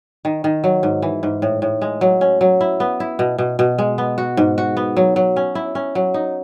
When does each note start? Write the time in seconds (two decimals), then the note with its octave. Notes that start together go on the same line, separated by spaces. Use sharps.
0.25 D#3
0.44 D#3
0.64 F#3
0.83 G#2
1.02 E3
1.23 G#2
1.42 A2
1.62 A2
1.82 G#3
2.01 F#3
2.21 C#4
2.41 F#3
2.61 E4
2.80 B3
3.00 E4
3.19 B2
3.38 B2
3.59 B2
3.78 G#3
3.98 B3
4.18 F#4
4.37 G#2
4.58 F#4
4.77 B3
4.97 F#3
5.16 F#3
5.36 C#4
5.55 E4
5.75 C#4
5.95 F#3
6.14 D#4